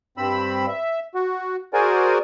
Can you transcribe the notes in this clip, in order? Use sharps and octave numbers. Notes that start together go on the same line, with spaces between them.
G2 C4 B5 E6
E5
F#4
F#4 G#4 A#4 C5 D5 G#5